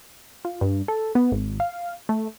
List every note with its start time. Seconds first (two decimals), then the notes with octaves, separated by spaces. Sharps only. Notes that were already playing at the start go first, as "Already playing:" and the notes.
0.45 F4
0.61 G2
0.88 A4
1.15 B3
1.32 G#1
1.60 F5
2.09 A3